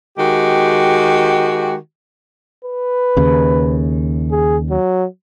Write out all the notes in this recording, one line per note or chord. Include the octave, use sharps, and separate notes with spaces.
D#3 G#3 F#4 G4
B4
D#2 C#3
G#4
F#3